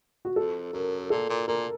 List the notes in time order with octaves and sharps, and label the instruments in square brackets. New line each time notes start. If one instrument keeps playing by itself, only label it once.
[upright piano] F#4
[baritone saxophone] F2 [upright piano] A4
[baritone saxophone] F#2 [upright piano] A#4
[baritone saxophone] A#2 [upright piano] A4
[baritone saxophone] A#2
[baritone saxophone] A#2 [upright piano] A#4